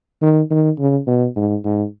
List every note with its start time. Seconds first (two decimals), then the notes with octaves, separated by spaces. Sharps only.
0.22 D#3
0.51 D#3
0.79 C#3
1.07 B2
1.36 G#2
1.64 G#2